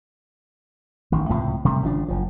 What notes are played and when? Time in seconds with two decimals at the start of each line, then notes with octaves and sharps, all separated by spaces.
1.12 A1 D#3
1.29 C#2 A2 C3 F3
1.65 C3 G3 A3
1.82 G#1 C#3 F3 D4
2.08 F#1 F3